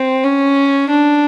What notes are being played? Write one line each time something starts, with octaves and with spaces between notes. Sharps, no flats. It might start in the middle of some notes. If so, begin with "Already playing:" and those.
Already playing: C4
C#4
D4